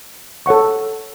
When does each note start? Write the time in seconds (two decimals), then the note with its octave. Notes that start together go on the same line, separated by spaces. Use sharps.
0.46 A4 C#5 F#5 C#6